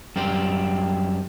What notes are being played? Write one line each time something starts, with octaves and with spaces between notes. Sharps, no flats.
F#2 G3 C4